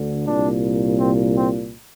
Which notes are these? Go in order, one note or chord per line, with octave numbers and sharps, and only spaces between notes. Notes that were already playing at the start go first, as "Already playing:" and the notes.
Already playing: D2 D3
C2 A#2 D4
C4
C4